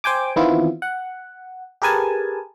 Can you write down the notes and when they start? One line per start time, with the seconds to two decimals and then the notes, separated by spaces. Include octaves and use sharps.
0.04 C5 G5 G#5 D6
0.36 D#3 E3 B3 C4 E4 F4
0.82 F#5
1.82 G4 G#4 A#4 B4 G#5 A5